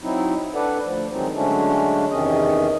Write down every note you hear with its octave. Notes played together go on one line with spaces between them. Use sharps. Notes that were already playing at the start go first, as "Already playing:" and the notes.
F#3 C4 D#4 E4
D4 A4 B4 D5 F#5
D2 F3
D#3 F3 F#3 G#3 C4 D#4
D3 F#3 G#3 A3 C#4 D4
E2 C3 D#3 C#4 D#5